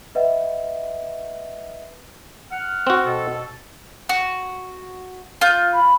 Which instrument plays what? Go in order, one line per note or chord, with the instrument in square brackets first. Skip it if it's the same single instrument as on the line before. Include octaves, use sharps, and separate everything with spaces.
[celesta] B4 D#5 E5 F#5
[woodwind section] F#5 F6
[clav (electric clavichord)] C4 F#4
[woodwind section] B2 A4
[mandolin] F#4
F4 G6
[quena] B5